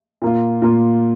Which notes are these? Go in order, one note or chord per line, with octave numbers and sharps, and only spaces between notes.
A#2 A#3 F4
A#2 A#3 F4